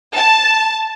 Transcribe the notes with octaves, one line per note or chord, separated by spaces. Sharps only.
A5